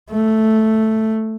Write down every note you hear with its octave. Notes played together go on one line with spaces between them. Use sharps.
A3